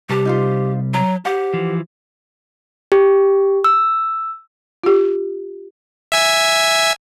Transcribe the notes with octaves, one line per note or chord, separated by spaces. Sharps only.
C3 G3 G4 B4 A5
D#4 F4 C5
F#3 A#5
G4 C5 F#5
E3 F3
G4
E6
F4 G4
E5 G#5 E6